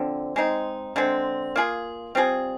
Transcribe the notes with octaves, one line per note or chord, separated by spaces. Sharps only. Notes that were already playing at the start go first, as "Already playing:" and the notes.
Already playing: D3 F3 C4
G#3 C4 D#4
D3 G#3 C4
A#3 F4 G#4
G3 C4 F4 G#4